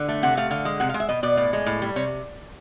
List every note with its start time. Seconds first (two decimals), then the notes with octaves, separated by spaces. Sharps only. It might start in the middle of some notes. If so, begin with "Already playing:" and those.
Already playing: D3
0.08 A3
0.23 C3 F#5
0.37 A3 F5
0.51 D3 F5
0.65 G#3
0.80 C3 F#5
0.89 F5
0.94 G#3
1.00 E5
1.09 B2 D#5
1.23 B2 D5
1.37 A2
1.53 G#3
1.66 A2
1.82 G3
1.96 C3 C#5